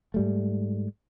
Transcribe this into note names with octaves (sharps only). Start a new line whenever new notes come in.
G#2 G3 A3